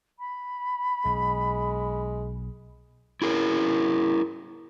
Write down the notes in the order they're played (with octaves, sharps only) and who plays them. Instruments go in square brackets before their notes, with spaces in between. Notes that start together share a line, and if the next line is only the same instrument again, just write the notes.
[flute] B5
[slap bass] B1 [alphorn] G#3
[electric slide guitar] E4 G#4 A#4